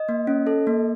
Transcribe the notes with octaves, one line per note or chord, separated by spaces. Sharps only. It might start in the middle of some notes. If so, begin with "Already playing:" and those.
Already playing: D#5
A#3
C#4
A4
A#3